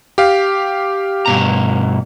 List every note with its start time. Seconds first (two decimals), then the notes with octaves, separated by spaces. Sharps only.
0.18 G4 F5
1.26 G2 B2 A#5